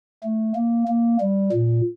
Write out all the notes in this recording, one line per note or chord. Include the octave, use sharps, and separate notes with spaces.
A3
A#3
A#3
G3
A#2